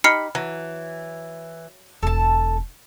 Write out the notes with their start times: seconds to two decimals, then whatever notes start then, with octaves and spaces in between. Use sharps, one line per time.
0.04 D#4 G4 B5 F6 C7 C#7
0.35 E3 F#3
2.03 E1 A4 A5